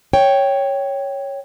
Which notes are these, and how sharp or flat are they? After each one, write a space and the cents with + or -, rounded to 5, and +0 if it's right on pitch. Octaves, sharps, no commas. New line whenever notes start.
C#5 +0 G5 +0